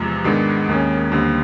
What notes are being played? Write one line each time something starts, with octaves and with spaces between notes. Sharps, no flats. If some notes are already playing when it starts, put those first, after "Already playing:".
Already playing: E2 C3 F3 G#3
G#2 D#3 G#3 B3 D4
D#2 D#3 G#3 C#4
D#2 D3 G3 C4